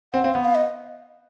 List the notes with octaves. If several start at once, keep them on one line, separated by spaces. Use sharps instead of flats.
C4 F#5
C4 F5
B3 F#5
F5
D#5